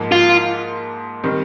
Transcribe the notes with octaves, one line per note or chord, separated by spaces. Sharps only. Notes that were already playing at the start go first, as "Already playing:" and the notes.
Already playing: G#2 F3 A#3
F4
D#3 G3 C4